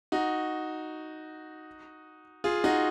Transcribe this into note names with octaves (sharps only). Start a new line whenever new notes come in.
D#4 F#4
F4 G#4
D#4 F#4